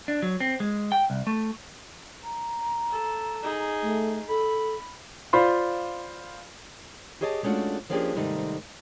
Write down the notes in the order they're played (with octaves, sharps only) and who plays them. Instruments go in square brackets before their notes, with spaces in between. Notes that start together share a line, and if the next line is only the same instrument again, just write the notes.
[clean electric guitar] D4
F#3
C4
G#3
G5
C2
A3
[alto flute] A#5
[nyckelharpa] A4
D#4 G#4
[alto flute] A3
[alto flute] A4 [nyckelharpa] B5
[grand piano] F4 C5 D5 F5 B5 C6
[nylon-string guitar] G4 G#4 C#5 D#5 G#5 A5
G#3 A3 C#4 D4 F4 F#4
F3 A#3 C#4 D4 G4 G#4
G#2 C3 D#3 G3 A3 D#4